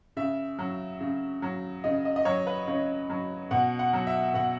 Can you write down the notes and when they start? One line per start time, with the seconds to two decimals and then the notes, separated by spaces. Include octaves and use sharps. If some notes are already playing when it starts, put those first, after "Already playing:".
0.17 C#3 E5
0.59 F#3
1.00 C#3
1.42 F#3
1.84 C#3 D#5
2.05 D#5
2.16 D#5
2.25 F#3 C#5
2.47 B4
2.68 C#3 C#5
3.10 F#3
3.51 B2 F#5
3.79 F#5
3.93 F#3
4.07 E5
4.34 B2 F#5